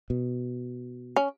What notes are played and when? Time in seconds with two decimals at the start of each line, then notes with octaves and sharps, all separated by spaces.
0.10 B2
1.16 C#4